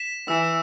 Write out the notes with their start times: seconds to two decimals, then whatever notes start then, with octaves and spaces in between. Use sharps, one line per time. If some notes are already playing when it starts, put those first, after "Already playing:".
Already playing: B6 E7
0.28 E3 E6 B6 E7